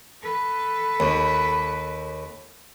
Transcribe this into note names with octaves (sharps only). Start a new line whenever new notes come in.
A4 B4
D#2